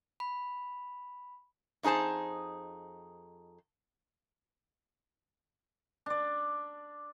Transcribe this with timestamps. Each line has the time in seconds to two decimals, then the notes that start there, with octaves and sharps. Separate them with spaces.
0.20 B5
1.83 F2 D#4 G#4 C5 A5
6.06 D4 D5